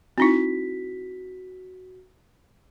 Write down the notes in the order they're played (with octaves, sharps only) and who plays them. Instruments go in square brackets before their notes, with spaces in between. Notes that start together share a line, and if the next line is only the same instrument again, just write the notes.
[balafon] C4 D#4 E4 [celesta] F#4 B6